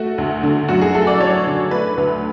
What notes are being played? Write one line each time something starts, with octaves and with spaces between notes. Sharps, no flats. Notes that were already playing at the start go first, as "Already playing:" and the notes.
Already playing: A3 F#4
D2
D3
F#2 F#4
G#4
A3 A4
D5
F#3 C#5
D3
A3 B4
D2